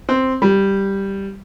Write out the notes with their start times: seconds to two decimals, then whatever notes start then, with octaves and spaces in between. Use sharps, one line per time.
0.09 C4
0.42 G3